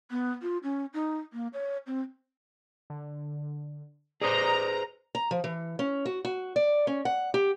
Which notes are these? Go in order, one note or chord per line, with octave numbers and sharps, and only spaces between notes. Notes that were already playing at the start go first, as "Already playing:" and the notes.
B3
F4
C#4
D#4
A#3
C#5
C4
D3
G#4 B4 C5 D5 A#5 D#6
A#5
F3
E3
C#4
F#4
F#4
D5
C#4
F#5
G4